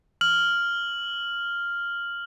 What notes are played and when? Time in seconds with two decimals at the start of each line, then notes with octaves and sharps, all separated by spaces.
0.21 F6 F#7